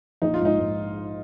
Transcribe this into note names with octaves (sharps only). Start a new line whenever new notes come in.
A#1 D#4
F4
G#2 D#4
G#2